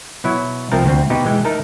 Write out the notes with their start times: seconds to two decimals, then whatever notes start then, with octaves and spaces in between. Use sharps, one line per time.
0.24 B2 F#3 E4
0.71 C2 F3 A3 C4 A#4 A5
0.86 D2 C4
1.10 B2 D#4 G4
1.25 E3 G#3 G5
1.45 A3 D#4 A#4 A5